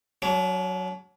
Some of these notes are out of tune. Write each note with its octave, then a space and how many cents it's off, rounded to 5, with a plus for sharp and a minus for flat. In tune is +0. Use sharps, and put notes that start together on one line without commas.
F#3 +0 D4 -40